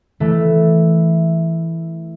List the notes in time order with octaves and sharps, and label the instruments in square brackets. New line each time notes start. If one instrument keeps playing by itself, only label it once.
[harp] E3 A3